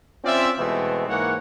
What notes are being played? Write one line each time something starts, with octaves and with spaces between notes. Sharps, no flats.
C4 C#4 F4 D5 E5
B2 E3 G#3 A3 B3 C4
G#2 E3 A#3 C#5 F#5